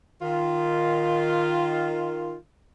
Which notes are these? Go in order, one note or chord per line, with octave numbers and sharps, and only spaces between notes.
D#3 F4